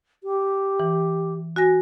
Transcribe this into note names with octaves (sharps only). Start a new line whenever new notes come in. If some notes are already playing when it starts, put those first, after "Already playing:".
G4
E3
F#4 G#5 A#6